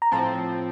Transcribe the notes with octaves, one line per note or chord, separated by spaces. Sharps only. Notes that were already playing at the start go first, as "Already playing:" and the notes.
A#5
A2 F3 C4 A5